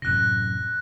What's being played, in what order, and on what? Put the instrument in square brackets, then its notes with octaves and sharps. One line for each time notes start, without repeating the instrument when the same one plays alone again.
[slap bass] F#2 A2 C3 [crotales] F#6 A#6